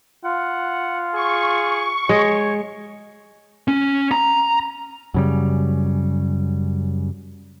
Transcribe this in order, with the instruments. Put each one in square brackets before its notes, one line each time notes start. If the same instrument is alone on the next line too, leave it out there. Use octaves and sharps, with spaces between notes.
[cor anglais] F4 [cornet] F#5
[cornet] G#4 [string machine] C#6
[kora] G#3 [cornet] C#5
[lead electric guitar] C#4
A#5
[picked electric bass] F#2 C#3 G3